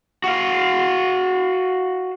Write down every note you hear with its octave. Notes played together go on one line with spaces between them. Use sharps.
F#4 F5